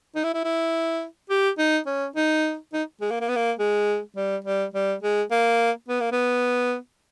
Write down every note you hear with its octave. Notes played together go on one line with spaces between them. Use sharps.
D#4
E4
E4
E4
G4
D#4
C#4
D#4
D#4
G#3
A#3
A#3
B3
A#3
G#3
G3
G3
G3
G#3
A#3
B3
A#3
B3